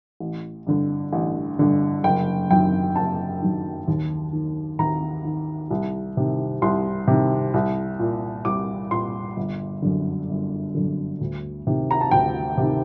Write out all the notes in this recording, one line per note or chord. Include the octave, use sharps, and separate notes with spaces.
A1
G2 D3
A1
G2 D3
F#1 G5
F#2 D#3 G5
F#1 A5
F#2 D#3
D#2
D#3
D#2 A#5
D#3
C2
C3 D#3
C2 C6
C3 D#3
C2
A#2
C2 D6
A#2 C6
G1
F#2 D3
G1
F#2 D3
D2
C3 D#3
A#5
A5
D2 G5
C3
D#3